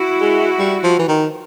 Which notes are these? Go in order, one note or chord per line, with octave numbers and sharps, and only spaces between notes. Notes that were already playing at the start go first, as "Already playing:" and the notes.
Already playing: E4 F#4
G#3
G3
F3
E3
D#3